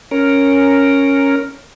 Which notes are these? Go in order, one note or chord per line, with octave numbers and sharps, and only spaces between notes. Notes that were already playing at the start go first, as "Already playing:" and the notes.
C#4 A#4